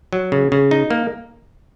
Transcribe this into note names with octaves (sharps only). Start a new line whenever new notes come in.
F#3
C#3
C#3
D#4
A#3